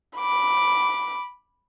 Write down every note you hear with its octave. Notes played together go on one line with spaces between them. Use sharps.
B5 D6